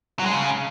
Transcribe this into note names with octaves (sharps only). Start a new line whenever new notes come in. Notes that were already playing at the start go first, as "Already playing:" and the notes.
F#3
G#3
C#3